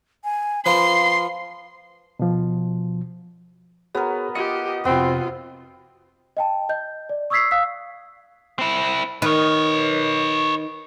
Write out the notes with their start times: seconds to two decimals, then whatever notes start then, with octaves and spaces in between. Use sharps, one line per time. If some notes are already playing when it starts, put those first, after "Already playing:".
0.24 G#5
0.66 F3 B4 F5 C6
2.20 B2 F3
3.95 B3 F#4 G#4 A#4 C#5
4.35 F4 G4 D#5 C#7
4.85 F2 C3 B3 C4 F4 F#4
6.37 D#5 G5 A5
6.69 D#5 G6
7.09 D5
7.30 C#6 D#6 E6 G#6 B6 C7
7.51 F5 D#6 E6 F#6 B6
8.59 C4 E4
9.22 D#3 B4 C#5